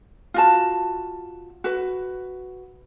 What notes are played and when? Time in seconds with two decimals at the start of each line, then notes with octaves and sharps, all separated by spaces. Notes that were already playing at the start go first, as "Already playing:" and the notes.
0.34 F4 F#4 A5
1.64 F#4 B4